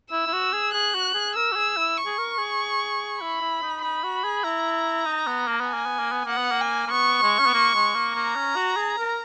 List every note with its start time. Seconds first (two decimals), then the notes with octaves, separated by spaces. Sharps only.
0.12 E4 E6
0.27 E4
0.33 F#4
0.53 G#4
0.74 G#4 F#6
0.95 F#4
1.14 G#4
1.35 A#4 E6
1.52 F#4
1.56 G#4
1.77 E4
1.97 C#6
2.06 G#4
2.18 A#4
2.38 G#4
3.20 E4 B5
3.41 E4
3.62 D#4
3.82 D#4 B5
4.03 F#4
4.24 G#4
4.44 E4 A#5
5.06 D#4
5.27 B3
5.47 A#3
5.60 B3
5.68 G#5
5.74 A#3
5.86 B3
5.99 A#3
6.12 B3
6.25 A#3 F#5
6.38 B3
6.51 A#3
6.61 G#5
6.86 A#3
6.91 B3 C#6
7.22 G#3
7.39 C#4
7.46 B3
7.54 A#3
7.75 G#3
7.94 A#3
8.15 A#3 A#5
8.36 C#4
8.56 F#4
8.77 G#4
8.98 A#4